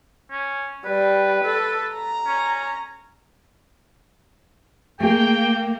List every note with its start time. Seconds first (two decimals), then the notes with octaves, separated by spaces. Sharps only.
0.31 C#4
0.85 G3 B4
1.45 A4
1.93 A#5
2.26 C#4
5.00 A3 A#3 G#4 G5